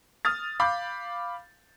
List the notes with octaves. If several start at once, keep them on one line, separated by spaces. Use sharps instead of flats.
D#6 F6 A6
F5 B5 D6 G6